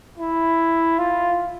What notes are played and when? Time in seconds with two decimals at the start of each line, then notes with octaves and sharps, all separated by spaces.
0.18 E4
0.99 F4